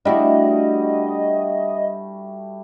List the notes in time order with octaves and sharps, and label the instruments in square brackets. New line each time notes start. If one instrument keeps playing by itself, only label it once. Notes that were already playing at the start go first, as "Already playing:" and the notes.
[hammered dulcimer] G3 A3 F#4 [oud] D4 E4 [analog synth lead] D#5